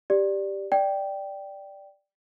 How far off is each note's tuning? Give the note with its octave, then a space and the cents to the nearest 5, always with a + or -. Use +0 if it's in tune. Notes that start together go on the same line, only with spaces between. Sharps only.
G4 +0 D5 +0
D5 +0 G5 -5